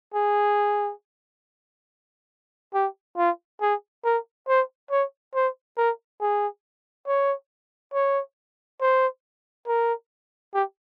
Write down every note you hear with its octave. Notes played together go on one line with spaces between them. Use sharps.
G#4
G4
F4
G#4
A#4
C5
C#5
C5
A#4
G#4
C#5
C#5
C5
A#4
G4